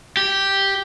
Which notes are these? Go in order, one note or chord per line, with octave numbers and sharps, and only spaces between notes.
G4